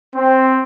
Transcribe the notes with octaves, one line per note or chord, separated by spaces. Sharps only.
C4